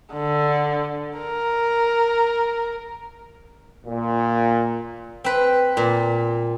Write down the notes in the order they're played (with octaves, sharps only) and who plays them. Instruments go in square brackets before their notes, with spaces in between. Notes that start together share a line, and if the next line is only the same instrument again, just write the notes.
[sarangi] D3
A#4
[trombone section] A#2
[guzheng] C4 B4
A#2